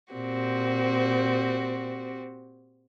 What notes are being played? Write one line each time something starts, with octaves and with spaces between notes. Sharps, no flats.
A#2 C4 F#4 G4